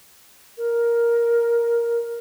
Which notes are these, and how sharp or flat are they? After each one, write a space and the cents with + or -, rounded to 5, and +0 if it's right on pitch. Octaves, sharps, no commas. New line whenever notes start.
A#4 +5